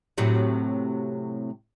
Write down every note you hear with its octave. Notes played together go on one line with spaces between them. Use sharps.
A2 C3 F#3